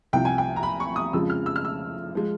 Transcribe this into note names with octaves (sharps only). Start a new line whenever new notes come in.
C2 C3 F3 G5
G#5
G5
A#5
B5
C#6
D#6
F2 C#3 F3 G#3 E6
F6
E6
F6
E6
F3 G#3